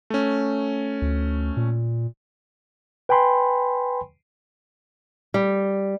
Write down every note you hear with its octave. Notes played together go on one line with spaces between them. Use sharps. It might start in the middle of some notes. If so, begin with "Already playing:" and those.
A3 C#4
D2
A#2
B4 G5 G#5 B5 C6
G3